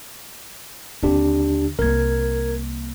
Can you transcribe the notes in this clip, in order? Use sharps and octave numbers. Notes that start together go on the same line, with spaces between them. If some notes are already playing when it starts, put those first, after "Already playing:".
D#2 D3 C4 D4 G4
C2 A#3 A#4 G#6